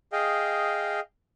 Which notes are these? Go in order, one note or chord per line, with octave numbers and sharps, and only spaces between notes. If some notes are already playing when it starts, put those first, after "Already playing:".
G#4 D#5 F5 G5